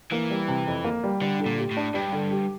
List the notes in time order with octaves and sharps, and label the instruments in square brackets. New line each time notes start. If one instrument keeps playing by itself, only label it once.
[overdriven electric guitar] E3 [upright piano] A#3
[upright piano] G3
C3
F2
A#3
G3
[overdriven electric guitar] D3 [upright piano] G3
[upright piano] D3
[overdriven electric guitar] A#2
[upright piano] G4
[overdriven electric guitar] A2
[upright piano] D4
[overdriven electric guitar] G2 [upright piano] G3
[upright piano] D3
G4